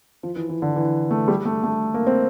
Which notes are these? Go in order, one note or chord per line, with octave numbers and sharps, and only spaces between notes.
F3
E3
E3
D3
E3
A3
G3
A3
A3
A#3
C4